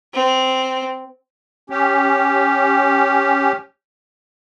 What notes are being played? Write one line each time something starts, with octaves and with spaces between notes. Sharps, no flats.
C4
C#4 G4